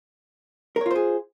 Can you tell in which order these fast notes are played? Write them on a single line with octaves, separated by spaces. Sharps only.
A#4 C#5 F4 C5 G#4